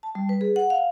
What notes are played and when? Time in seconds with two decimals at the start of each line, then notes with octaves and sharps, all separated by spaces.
0.03 A5
0.15 G3
0.29 B4
0.41 G#4
0.56 F#5
0.70 F5